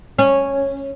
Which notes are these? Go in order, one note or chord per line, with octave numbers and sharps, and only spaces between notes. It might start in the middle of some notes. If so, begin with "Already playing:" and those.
C#4